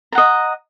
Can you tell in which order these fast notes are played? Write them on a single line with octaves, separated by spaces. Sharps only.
A#5 F#5 D#5